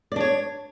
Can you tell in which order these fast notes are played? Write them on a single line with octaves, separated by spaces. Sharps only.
D5 D4 C#5